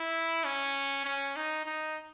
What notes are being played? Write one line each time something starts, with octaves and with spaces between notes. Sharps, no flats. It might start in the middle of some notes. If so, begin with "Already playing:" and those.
Already playing: E4
C#4
C#4
D#4
D#4